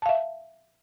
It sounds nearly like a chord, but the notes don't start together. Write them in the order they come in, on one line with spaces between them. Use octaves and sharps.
A5 F5 E5